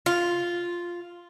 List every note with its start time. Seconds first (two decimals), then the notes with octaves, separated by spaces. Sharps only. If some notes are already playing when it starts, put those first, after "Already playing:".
0.06 F4